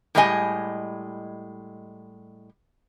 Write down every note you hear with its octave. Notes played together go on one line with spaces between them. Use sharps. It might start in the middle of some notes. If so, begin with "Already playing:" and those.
A2 G3 G#3 G4 D#5 G#5